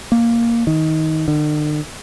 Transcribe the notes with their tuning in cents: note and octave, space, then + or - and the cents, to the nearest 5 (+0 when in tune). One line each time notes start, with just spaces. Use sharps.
A#3 +0
D#3 +20
D3 +45